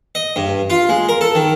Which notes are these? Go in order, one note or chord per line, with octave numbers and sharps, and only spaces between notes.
D#5
G2
F4
G#3
A#4
A4
D#3